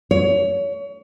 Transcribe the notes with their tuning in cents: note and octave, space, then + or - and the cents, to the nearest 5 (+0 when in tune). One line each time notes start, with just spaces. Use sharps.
C#5 +30